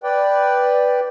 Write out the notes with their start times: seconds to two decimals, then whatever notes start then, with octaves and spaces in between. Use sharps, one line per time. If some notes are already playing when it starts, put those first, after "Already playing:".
0.03 B4 D5 G5